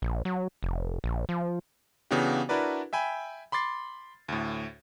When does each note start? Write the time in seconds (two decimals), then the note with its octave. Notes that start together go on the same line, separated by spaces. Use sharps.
0.02 A#1
0.25 F#3
0.63 F1
1.04 A#1
1.29 F3
2.11 C#3 E3 B3 D4 F#4 G4
2.49 D4 E4 F#4 A#4 B4 D5
2.93 E5 G5 G#5 B5
3.52 B5 C6 D6 A6 C7
4.29 D2 A2